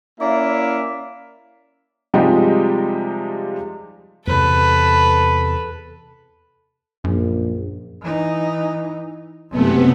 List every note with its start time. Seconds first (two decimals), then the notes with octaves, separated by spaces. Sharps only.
0.20 A#3 C#4 E4 D5 E5 F5
2.14 C3 F3 G3 G#3 D#4 G4
4.27 E2 C3 A4 B4
7.04 A#1 F#2
8.02 E3 D#4
9.51 F#1 C3 A3 B3